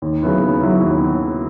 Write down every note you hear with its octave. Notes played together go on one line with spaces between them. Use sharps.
D#2
C#3 F#3 B3 E4
D#2
C#3 F#3 B3 E4
D#2
C#3